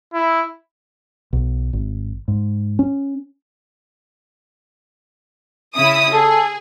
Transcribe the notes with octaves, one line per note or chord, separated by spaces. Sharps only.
E4
B1
G#1
G#2
C#4
C#3 E4 D#6
G#4 A4